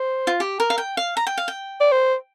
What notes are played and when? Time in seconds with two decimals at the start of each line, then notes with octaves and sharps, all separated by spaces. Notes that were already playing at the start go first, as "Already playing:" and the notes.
Already playing: C5
0.27 F4
0.40 G4
0.60 A#4
0.70 F5
0.78 G5
0.97 F5
1.17 A#5
1.27 G5
1.38 F5
1.48 G5
1.81 D5
1.92 C5